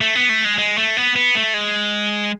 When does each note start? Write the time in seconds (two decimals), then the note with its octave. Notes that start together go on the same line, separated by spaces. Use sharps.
0.01 A3
0.15 B3
0.29 A3
0.45 G#3
0.58 G#3
0.78 A3
0.97 B3
1.16 B3
1.35 A3
1.54 G#3